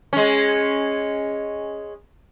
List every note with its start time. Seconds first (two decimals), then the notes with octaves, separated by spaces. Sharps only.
0.13 G#3 C#4